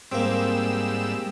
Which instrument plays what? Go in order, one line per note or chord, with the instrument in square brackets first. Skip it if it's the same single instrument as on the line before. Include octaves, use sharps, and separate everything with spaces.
[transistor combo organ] G#2 G3 E6 [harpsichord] A#3 C4